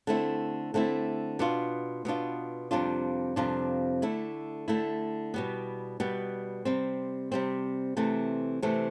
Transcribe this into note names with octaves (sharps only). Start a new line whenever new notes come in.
D3 A3 C4 E4
D3 A3 C4 E4
B2 B3 D4 F4
B2 B3 D4 F4
F2 C3 G3 D4 F4
F2 C3 G3 D4 F4
D3 A3 E4
D3 A3 E4
B2 G3 B3
B2 G3 B3
C3 G3 C4
C3 G3 C4
C3 E3 A3 C4
C3 E3 A3 C4